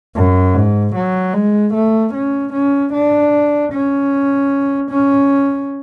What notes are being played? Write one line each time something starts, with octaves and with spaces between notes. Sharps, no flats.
F#2
G#2
F#3
G#3
A3
C#4
C#4
D4
C#4
C#4